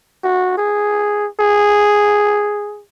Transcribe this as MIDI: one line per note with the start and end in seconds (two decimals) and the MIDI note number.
0.23 0.53 66
0.57 1.28 68
1.40 2.83 68